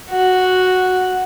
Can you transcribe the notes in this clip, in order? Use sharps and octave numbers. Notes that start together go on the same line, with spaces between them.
F#4